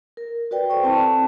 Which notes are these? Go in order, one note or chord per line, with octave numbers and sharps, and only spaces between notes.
A#4
F#4 B4 D5 G5
A4 C5 D5 G5 C#6
C4 E4 A5